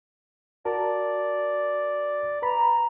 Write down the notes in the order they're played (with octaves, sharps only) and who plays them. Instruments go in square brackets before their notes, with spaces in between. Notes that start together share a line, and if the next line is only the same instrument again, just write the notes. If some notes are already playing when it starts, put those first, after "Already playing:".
[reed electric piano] F#4 A#4 A5 [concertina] D5
[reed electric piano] B4 B5 [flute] A#5